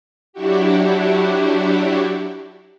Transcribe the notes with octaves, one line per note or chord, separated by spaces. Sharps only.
F#3 D4 E4 F#4 G4